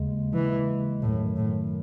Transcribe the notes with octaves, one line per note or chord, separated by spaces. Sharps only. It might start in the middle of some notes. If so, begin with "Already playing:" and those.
Already playing: D#2 C#3 G#3
E3
F#2 A2 D#3 F#3
A2